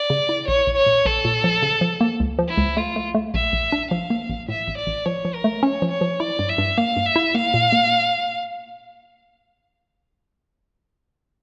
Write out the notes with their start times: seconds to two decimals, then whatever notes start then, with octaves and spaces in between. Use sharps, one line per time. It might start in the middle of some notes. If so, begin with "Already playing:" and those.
Already playing: D5
0.10 C#3
0.29 E4
0.48 A#1 C#5
0.67 A#1
0.76 C#5
0.86 A#2
1.05 A#1 A4
1.25 A#2
1.44 F3
1.62 C#3
1.81 F3
2.01 A#3
2.20 C#2
2.39 F3
2.49 E4
2.58 C#2
2.77 A3 F4
2.96 A3
3.15 A3
3.34 A#1 E5
3.53 A#1
3.72 D4
3.91 F3 F5
4.10 A#3
4.29 A1
4.49 A2 E5
4.68 A1
4.78 D5
4.87 A1
5.05 F3 C#5
5.25 F3
5.34 A#4
5.44 A3
5.63 C#4 C#5
5.82 F3
5.91 C#5
6.01 F3
6.20 E4 D5
6.39 G2
6.49 E5
6.58 G2
6.77 A#3 F5
6.97 G2
7.06 E5
7.16 E4
7.34 A#3 F5
7.54 A#2
7.72 A#3